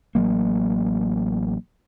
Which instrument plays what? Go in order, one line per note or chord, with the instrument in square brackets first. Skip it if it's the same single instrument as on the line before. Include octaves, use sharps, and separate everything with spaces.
[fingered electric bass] A1 F#3 A#3